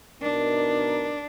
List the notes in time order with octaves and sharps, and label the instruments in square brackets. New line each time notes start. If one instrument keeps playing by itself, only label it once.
[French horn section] B2 D#4 A#4 [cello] D4